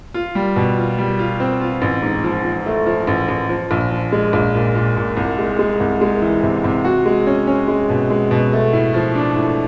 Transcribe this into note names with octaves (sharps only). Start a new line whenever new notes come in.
F4
G3
B2
F4
G3
F4
C4
F4
A1
G#2
F3
F3
A3
F3
A1
A1
F3
A#1
F3
G#3
A#1
A#2
A#2
A#2
C2
G#3
G#3
C2
G#3
E3
C3
C3
F#4
G#3
C#4
C#4
G#3
B2
G#3
B2
A3
A2
F3
D4
A2